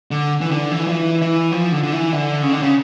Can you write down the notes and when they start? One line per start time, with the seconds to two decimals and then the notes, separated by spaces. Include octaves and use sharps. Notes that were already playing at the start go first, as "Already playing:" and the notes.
0.11 D3
0.41 E3
0.51 D3
0.72 E3
0.87 F3
0.92 E3
1.22 E3
1.52 F3
1.72 D3
1.83 D3
1.92 E3
2.12 D3
2.42 C#3
2.52 D3
2.62 C#3